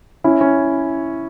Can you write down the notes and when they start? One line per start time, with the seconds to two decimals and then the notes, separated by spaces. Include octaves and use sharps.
0.24 C#4 E4
0.41 C#4